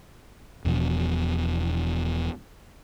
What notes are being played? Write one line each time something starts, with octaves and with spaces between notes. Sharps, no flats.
E1 E2 B2 F3